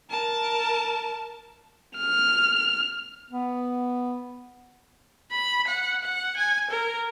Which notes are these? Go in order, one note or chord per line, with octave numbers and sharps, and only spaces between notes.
A#4 A5
F6
B3
B5
F#5
F#5
G#5
A#4